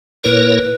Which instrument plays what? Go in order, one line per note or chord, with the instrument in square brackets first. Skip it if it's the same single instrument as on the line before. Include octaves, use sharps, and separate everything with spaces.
[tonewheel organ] A#2 A#3 E4 A#4 C#5 [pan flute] B4